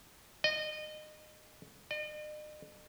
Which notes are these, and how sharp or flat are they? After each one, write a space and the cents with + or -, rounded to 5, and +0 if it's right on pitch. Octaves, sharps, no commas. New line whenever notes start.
D#5 -25
D#5 -45